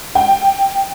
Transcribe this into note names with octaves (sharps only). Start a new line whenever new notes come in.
G5